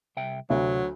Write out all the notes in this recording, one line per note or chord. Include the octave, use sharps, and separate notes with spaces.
C2 E5 G5
D2 C3 F#3